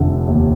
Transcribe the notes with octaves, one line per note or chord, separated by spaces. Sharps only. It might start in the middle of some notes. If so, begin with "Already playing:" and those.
Already playing: F1 D3
D#2